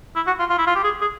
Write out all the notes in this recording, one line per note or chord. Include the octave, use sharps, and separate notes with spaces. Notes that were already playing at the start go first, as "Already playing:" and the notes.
E4
F#4
F4
F4
E4
F4
G4
G#4
G#4